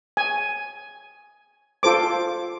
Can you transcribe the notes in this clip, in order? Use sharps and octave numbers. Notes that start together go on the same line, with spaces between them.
G#5
F4 A4 C5 D6